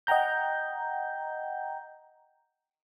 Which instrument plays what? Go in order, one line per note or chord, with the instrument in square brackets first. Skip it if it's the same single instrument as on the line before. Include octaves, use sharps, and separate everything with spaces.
[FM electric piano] D#5 F#5 G5 A#5 G6